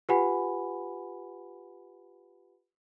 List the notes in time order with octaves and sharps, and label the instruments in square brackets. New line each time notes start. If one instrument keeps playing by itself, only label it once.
[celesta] F4 G4 B4 F#5 G#5 B5